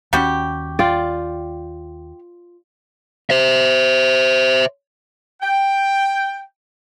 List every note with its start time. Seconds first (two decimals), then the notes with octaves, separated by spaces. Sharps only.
0.13 D#2 G3 B3 C#4 F#4 G4
0.79 F4 D5 G5
3.30 C5 E5
5.42 G5